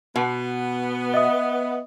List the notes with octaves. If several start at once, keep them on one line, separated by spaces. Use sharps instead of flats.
B2 B3
D#5 E5 D#6